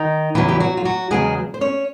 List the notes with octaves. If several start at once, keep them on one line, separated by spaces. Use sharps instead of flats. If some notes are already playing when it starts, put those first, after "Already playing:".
Already playing: D#3 D#4
E2 C#3 E3 F#3 E4
G4
F#3 F#4
F4
F#3 F#4
E2 C#3 F#3 G#3 G#4
C5
C#4 C#5